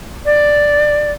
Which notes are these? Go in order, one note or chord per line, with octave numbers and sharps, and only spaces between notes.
D5